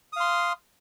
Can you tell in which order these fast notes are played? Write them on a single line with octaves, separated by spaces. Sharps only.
D#6 F5 C6